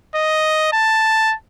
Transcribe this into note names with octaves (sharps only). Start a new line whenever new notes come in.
D#5
A5